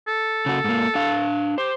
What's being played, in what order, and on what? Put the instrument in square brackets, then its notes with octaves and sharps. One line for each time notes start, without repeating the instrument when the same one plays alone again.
[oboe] A4
[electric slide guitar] C#3 F#4
G#2 A#3
D4 F5
[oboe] G4 [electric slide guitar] C5